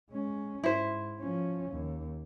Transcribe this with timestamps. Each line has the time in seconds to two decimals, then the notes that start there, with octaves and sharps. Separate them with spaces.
0.11 G#3 C#4
0.64 G#2 E4 C5
1.19 F3 C#4
1.71 D#2